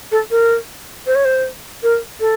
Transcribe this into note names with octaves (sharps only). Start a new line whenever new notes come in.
A4
A#4
C5
C#5
C5
A#4
A4